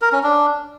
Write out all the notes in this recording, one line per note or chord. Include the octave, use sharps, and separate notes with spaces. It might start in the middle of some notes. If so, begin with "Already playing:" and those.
A#4
C#4
D4